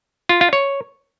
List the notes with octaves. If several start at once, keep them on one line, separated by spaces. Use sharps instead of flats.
F4
F4
C#5